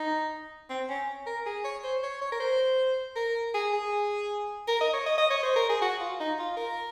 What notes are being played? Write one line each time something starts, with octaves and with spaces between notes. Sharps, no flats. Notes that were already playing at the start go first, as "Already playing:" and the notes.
Already playing: D#4
C4
C#4
A#4
G#4
C#5
C5
C#5
C#5
A#4
C5
A#4
G#4
G#4
A#4
D#5
C#5
D#5
D#5
C#5
C5
A#4
G#4
F#4
F4
D#4
F4
A#4